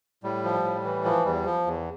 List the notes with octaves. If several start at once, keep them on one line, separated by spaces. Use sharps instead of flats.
A2 G3
F3
A2
E3
F3
E2 G3
F3
E2